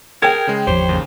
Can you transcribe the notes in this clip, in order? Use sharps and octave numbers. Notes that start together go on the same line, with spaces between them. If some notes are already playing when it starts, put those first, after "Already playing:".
G#4 A#4 G5 G#6
C#3 G#3
G#1 E2 F3 G4 C5 C#5
D#2 C#3